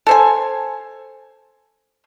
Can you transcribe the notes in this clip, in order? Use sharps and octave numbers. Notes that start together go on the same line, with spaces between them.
A4 C5 G#5